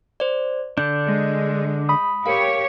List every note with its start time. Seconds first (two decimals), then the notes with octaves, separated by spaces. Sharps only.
0.20 C5 D5
0.78 D3 D4 G6
1.06 G#3
1.89 B5 D#6
2.26 G4 A#4 C#5 F5